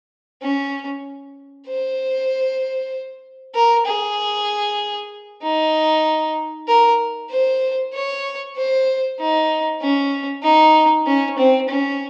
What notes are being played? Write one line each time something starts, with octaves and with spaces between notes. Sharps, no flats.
C#4
C5
A#4
G#4
D#4
A#4
C5
C#5
C5
D#4
C#4
D#4
C#4
C4
C#4